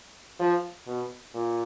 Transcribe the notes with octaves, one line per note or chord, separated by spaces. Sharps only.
F3
B2
A#2